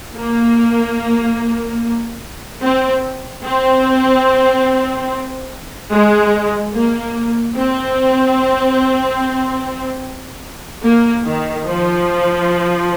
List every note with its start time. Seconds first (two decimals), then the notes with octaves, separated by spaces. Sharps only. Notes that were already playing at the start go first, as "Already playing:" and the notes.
0.16 A#3
2.63 C4
3.44 C4
5.91 G#3
6.73 A#3
7.56 C4
10.84 A#3
11.25 D#3
11.66 F3